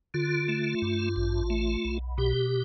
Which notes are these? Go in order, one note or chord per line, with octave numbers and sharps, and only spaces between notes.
D3 F4
A3
G2
A1
A3
B1
B2 G4